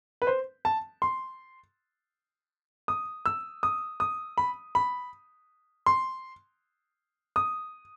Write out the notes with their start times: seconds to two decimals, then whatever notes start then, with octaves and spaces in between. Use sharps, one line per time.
0.22 B4
0.27 C5
0.65 A5
1.02 C6
2.88 D#6
3.26 E6
3.63 D#6
4.00 D#6
4.38 B5
4.75 B5
5.86 C6
7.36 D#6